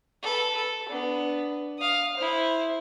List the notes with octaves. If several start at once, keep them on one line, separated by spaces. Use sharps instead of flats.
A4 B4
A4
B3 D4
F5 D#6
E4 C5